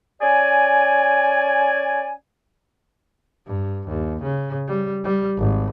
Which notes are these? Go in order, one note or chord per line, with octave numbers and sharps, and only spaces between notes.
C#4 D5 G#5
G2
D#2
C#3
G3
G3
G#1